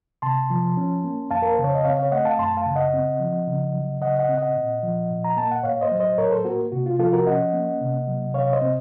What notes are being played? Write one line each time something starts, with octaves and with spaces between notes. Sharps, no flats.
C3 A5 C6
F3
C#4
A#3
F2 F5 A5
A#4
C5
C#3
C#5
D#5
C4 C#5 F5
C#5 F5
A3 D#5 F#5
F5 A5
F#2 A5 C6
F5 A5
C#3
D#5 F#5
C4
F3
C#3
F#3
C#3 D#5 F#5
D#5 F#5
C4
D#5 F#5
A#2
F3
A#2
A#5
A#3 A5
F#5
A2 C#5 F5
C5 D#5
F#3
C5 D#5
A2 A#4 C#5
A4 C5
A#3 F#4 A#4
C3 F#4
F4
F3 F4 A4
F#4 A#4
C#4 D#5 F#5
A#3
C3
F#3
C3 C#5 F5
C5 D#5
C4